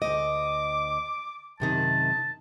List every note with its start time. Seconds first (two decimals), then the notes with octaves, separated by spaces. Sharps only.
0.02 D2 D#5 D6
1.60 F#2 C3 D#3 A5